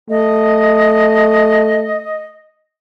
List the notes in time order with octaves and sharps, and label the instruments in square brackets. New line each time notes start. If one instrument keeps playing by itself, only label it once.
[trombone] A3 [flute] D#5